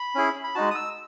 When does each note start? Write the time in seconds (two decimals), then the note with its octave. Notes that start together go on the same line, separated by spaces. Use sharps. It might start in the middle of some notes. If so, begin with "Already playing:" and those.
Already playing: B5
0.15 C#4 E4 G#4
0.44 B5
0.55 G#3 D#4 F#4 A5
0.71 D#6
0.75 E6